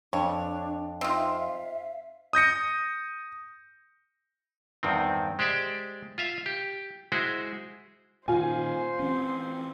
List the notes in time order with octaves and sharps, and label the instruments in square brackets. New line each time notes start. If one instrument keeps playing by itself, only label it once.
[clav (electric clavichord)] F2 [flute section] D4 [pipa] C#5
[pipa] C4 D#4 F4 [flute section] E5 F5
[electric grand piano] D#6 G6 A#6 C#7
[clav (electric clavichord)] E2 G2 D#3 C4
G#3 G4 C5 D5 E5
F4 E5 F5
G4
G#3 E4 F#4 G#4 C5
[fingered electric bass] A#2 D#3 [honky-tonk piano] F4 G#5 [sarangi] C5
[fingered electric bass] E3 C#4 [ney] C4